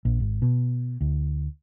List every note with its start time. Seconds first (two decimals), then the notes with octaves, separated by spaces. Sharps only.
0.05 A#1
0.20 G#1
0.42 B2
1.01 D2